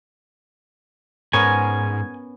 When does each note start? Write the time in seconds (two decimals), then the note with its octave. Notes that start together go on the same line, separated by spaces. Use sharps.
1.33 G#2 B3 C#4 A#4 G#5